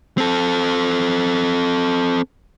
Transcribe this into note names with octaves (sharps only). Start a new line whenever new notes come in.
C4 A4